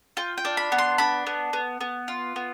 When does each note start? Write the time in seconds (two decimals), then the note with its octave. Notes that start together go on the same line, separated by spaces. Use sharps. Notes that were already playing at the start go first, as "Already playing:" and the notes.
0.17 F4 G5
0.38 G5
0.45 D4
0.57 B5
0.72 B3
0.78 C6
0.98 D4 B5
1.27 B3
1.53 B3
1.81 B3
2.08 F4
2.36 B3